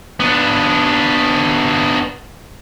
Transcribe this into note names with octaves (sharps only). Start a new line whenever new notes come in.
B3 D4